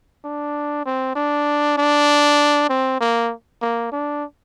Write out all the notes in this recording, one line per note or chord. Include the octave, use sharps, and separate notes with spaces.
D4
C4
D4
D4
C4
A#3
A#3
D4